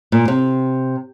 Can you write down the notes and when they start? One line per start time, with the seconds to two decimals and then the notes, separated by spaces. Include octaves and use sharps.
0.12 A#2
0.28 C3